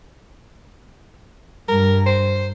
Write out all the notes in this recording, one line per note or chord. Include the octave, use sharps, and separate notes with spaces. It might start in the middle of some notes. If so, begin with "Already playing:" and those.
G2 A#4
C5